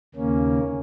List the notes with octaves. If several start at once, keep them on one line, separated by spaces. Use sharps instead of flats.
D#2 C#3 A#3 C#4